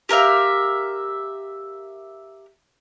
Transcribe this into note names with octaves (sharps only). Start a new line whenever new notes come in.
G4 A#4 E5 F5